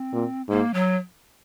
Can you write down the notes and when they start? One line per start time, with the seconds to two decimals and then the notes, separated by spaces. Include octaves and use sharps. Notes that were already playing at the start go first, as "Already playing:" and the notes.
Already playing: C4
0.13 A#2
0.49 G#2 A#3
0.74 F#3